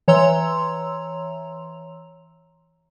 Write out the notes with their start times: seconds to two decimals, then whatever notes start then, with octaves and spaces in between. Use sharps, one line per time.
0.08 E3 C#5 A#5 C6 E6 F7